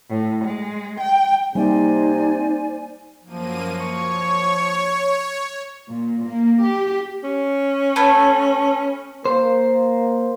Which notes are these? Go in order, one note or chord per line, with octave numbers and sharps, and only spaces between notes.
A2
G#3
G5
C3 G3 A#3 D#4 C5 D5 G#5
F#2 F3 A#3 D#7
C#5 C#6
A#2
A#3
G4
C#4
A3 B3 G#5
A#3 C5